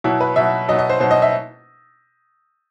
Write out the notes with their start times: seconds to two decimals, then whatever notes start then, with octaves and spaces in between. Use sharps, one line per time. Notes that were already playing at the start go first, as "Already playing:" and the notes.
0.04 B2 F#3 E4
0.21 B4
0.36 B2 F#3 E5
0.68 F#3 D#5
0.72 B2
0.79 D#5
0.90 C5
1.00 B2 F#3 C5
1.11 D#5
1.22 E5